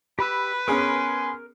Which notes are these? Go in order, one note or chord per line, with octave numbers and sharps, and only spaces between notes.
G4 B4 B5 E6
B3 C#4 G#4 A#4 G#5 C6